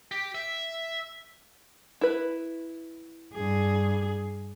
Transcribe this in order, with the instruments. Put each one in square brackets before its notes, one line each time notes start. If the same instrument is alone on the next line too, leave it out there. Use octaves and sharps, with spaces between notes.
[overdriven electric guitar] G4
E5
[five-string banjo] E4 B4
[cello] G2 G#4